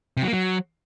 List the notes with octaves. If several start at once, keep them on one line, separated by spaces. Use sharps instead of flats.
C3
F#3
A#3
F#3